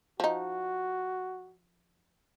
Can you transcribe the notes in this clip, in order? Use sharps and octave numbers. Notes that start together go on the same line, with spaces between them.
F3 D#4 F#4